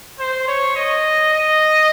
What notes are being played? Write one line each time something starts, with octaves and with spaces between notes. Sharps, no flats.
C5
C#5
D#5
D#5